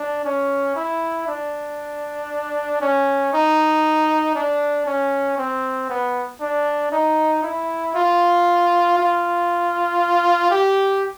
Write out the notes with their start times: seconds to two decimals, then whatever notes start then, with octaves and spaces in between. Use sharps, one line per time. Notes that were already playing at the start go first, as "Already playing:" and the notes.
Already playing: D4
0.25 C#4
0.76 E4
1.28 D4
2.81 C#4
3.33 D#4
4.35 D4
4.87 C#4
5.38 C4
5.90 B3
6.41 D4
6.92 D#4
7.43 E4
7.95 F4
8.98 F4
10.51 G4